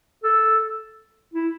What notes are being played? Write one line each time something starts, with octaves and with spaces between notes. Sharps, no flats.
A4
E4